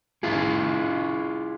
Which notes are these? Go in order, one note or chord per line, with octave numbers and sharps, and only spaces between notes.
E4 F4 G#4